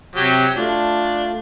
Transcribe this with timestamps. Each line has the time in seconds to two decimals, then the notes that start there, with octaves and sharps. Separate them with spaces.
0.15 C3 F#3 G4
0.57 A3 D4 F4